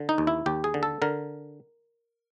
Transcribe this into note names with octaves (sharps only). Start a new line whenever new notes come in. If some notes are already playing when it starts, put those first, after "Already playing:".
Already playing: D3
D#4
D#2
E4
D#2 G4
G#4
D3
A4
D3 A#4